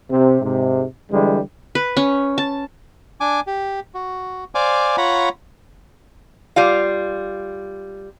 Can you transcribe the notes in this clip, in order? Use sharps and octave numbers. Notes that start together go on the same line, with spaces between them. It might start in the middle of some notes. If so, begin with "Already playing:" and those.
C3
G#2 C3
D3 E3 G3 G#3
B4
C#4
A5
D4 G#5 D6
G4
F#4
C5 D5 F5 G#5 D6
F4 C#5 F#5 A#5 B5
G3 F4 F5